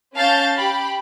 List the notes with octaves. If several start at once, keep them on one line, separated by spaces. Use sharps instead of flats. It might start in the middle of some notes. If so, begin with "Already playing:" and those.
C#4 F5 A5 G6 A6
G4 B5